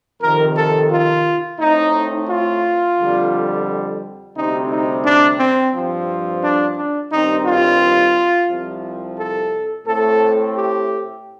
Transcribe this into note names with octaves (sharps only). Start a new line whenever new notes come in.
F2 C3 D#3 A#4
A4
F4
A2 A3 C4 D#4
F4
F2 D3 G3
D2 C3 G3 C4 D#4
D#4
D4
C4
G2 F3 C4
D4
D4
G2 D#3 G3 C4 D#4
F4
C2 C3 F3
A4
A2 A3 C4 A4
G4